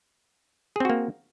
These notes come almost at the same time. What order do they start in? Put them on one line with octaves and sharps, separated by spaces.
G#4 C4 F#4 A#3